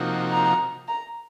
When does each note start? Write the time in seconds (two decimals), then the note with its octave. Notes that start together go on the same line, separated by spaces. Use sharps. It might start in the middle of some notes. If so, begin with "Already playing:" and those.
Already playing: C3 F3 A#3 D#4 F#4
0.32 A#5
0.88 A#5